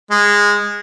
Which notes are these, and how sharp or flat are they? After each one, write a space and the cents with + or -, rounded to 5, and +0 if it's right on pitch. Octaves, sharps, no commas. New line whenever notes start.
G#3 -15